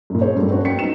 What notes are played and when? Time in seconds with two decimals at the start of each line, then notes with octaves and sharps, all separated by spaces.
0.10 F#2 A#2
0.21 C#4 G#4 C5 C#5
0.37 G2 F#3 A3 C4
0.51 A#3 C#4 F#4 B4
0.65 F#2 G5 B6 C#7
0.79 D#4 E7